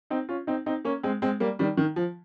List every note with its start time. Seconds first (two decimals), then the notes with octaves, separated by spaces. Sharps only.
0.10 C4 D#4
0.29 C#4 F4
0.47 C4 D#4
0.66 C4 D#4
0.85 A#3 C#4
1.03 G#3 C4
1.22 G#3 C4
1.40 G3 A#3
1.59 D#3 G3
1.77 D#3
1.96 F3